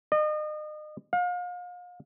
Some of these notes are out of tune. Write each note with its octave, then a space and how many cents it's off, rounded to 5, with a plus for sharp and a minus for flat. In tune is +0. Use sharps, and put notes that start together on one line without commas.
D#5 -35
F5 +40